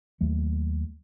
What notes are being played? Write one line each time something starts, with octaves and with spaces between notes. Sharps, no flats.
D#2 F#3 A3